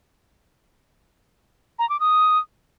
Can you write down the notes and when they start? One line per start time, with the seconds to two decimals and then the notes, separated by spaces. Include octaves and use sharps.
1.79 A#5
1.89 D6
2.00 D#6